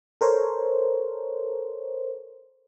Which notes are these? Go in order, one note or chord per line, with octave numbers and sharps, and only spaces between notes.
A4 A#4 C5 C#5